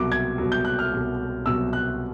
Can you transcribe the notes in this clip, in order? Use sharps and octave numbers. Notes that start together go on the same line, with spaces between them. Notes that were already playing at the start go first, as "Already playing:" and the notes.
Already playing: C2 B2 F#3 D6
G#6
C2 B2 F#3
G6
F#6
F6
C2 B2 F#3
C2 B2 F#3 E6
F#6